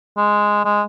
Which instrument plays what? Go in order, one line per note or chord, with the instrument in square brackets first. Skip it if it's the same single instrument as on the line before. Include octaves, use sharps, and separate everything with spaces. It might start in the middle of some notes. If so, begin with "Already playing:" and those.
[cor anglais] G#3
G#3